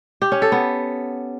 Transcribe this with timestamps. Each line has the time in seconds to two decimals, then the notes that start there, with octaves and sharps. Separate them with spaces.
0.22 G4
0.32 C#4
0.42 A4
0.52 B3